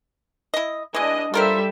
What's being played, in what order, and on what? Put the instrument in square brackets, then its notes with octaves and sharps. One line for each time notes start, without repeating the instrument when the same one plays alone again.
[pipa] E4 D#5
[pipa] E3 G#3 [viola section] D4 D#5
[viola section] G3 A4 E5 [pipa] F4 A#4 C5